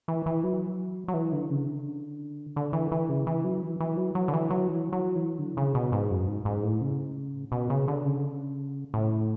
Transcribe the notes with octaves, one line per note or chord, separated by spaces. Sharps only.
E3
E3
F#3
F#3
E3
D3
C#3
D3
D3
E3
E3
C#3
E3
F#3
E3
E3
F#3
F#3
D3
E3
F#3
E3
F#3
E3
D3
C#3
B2
G#2
F#2
G#2
G#2
A2
C#3
B2
C#3
D3
C#3
A2